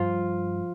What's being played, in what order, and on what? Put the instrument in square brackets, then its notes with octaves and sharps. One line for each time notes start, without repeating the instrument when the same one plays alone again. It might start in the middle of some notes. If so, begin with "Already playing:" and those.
Already playing: [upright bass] G2 [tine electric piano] F3 F4